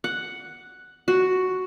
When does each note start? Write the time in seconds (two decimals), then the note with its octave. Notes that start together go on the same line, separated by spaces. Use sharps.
0.04 F#5
1.08 F#4